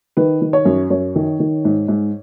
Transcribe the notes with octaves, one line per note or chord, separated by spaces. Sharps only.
D#3 B4
D#3
C#5
F#2
F#2 C#5
D#3
D#3
G#2
G#2